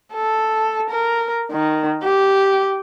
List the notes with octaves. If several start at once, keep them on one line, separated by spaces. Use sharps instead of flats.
A4
A#4
D#3
G4